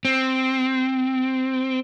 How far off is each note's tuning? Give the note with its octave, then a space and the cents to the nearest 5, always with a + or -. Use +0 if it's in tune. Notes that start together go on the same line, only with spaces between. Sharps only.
C4 -5